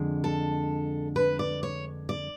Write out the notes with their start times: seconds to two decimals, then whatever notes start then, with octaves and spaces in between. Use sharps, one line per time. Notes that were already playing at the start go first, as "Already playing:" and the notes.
Already playing: F2 D3 G#3
0.24 A4
1.16 B4
1.39 D5
1.63 C#5
2.09 D5